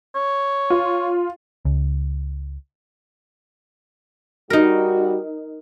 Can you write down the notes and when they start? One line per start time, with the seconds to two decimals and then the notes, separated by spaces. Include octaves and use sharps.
0.15 C#5
0.70 F4
1.65 C#2
4.50 G3 D#4 F#4 A#4